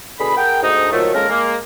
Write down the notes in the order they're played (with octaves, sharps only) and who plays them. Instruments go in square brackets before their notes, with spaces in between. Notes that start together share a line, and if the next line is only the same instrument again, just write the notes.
[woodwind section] B2 D3 G#4 B5
G#4 A#4 F#5 G5
D2 G#2 D#4
A#2 D#3 F3 F#3 A3
G#3 A#3 C#4 A4 A#4
G#3 A#3